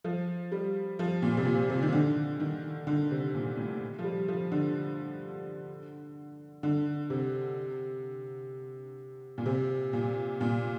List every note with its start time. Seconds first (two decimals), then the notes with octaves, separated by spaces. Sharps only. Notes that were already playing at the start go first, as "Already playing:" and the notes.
0.04 F3
0.52 G3
0.99 F3
1.22 A#2
1.37 C3
1.45 A#2
1.70 C3
1.82 D#3
1.93 D3
2.40 D#3
2.87 D3
3.11 C3
3.34 A#2
3.57 A2
3.99 F3
4.04 G3
4.28 F3
4.52 D3
6.63 D3
7.10 C3
9.38 A#2
9.46 C3
9.93 A#2
10.41 A#2